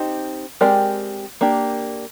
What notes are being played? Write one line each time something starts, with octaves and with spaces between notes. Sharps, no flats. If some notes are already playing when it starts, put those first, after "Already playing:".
Already playing: C4 D#4 G4
G#3 C4 G4 A#4 D5
A#3 D4 G4